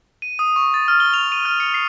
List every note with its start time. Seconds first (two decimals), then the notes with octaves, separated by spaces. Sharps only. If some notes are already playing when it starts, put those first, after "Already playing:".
0.22 D#7
0.39 D#6
0.56 C#6
0.74 A6
0.88 F6
1.00 G7
1.14 F7
1.32 D#7
1.45 F6
1.60 C#7
1.74 C7